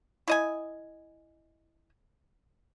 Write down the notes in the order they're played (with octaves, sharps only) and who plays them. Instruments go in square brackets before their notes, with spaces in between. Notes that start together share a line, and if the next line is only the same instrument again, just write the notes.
[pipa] E4 D#5 G#5